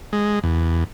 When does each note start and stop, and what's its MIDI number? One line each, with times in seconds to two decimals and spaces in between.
0.13 0.39 56
0.43 0.84 40